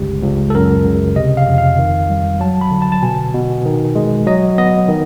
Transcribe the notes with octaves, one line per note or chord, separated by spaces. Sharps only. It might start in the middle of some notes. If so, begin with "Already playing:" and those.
Already playing: G1 C#2 G4
C#2
A4
F#2 A#4
C#3
C3 D#5
F5
F2
F5
D#3
G3
F#3 A5
B5
D3
A5
A5
B2 G#5
B2
D#3
G#3
F#3 D#5
B3 D#5
D#3